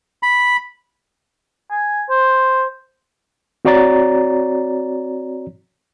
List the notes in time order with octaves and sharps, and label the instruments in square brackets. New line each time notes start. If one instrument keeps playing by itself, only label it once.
[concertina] B5
[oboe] G#5
C5
[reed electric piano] C4 F#4 C#5 D5 A#5 A6